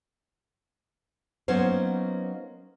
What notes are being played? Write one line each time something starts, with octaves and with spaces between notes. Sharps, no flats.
F#3 A#3 B3 C#4 D#4 C5